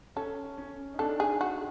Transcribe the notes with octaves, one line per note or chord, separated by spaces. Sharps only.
C#4 A4
C#4
D#4
D4 A4
G#4
F#4